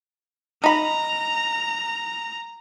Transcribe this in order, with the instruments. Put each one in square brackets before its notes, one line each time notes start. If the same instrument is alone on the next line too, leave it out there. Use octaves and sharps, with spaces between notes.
[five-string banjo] D#4 B5 [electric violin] A#5